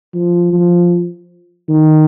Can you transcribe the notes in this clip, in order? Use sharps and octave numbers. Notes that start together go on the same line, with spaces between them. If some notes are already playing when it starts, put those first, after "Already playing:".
F3
F3
D#3